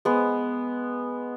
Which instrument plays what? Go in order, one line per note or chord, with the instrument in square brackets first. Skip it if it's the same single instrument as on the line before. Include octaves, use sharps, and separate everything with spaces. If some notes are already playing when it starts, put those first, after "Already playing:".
[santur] G#3 B3